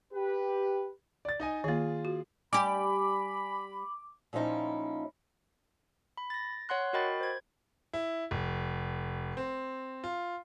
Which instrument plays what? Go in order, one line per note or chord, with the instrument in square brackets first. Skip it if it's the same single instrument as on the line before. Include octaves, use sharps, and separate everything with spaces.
[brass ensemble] G4 B4
[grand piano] D5 A6
D#4 D#5 G#5
[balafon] D#3 A#3 [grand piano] F4 G#4
[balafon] F#4
[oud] G3 G4 [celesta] G#5 [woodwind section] B5 [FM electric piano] D6
[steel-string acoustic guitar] A#2 F3 C#4 D#4 E4
[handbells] B5
A6 A#6
C#5 F#5 C6 F#6
F#4 A#4 D#5 G5 B5 A6
C5 G#6
[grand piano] E4
F1
C4
F4